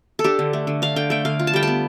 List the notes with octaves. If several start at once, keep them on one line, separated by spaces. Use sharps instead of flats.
A4
D4 G4
D3
A3
D3
D4 F5
D3 G5
A3 G5
D3 F5
F4
A5
G3 G5
B3 A5